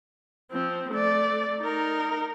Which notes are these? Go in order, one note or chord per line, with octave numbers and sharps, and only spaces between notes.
F3 C4
A3 D5
D#4 A#4